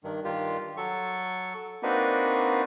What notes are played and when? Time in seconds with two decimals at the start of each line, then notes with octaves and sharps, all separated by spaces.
0.04 G2 D#3
0.24 G2 D#3 F4 G4
0.77 F#3 A4 C#6
1.83 A#3 C4 D4 D#4 F#4 B4